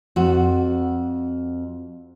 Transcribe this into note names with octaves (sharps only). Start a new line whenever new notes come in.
F2 F#4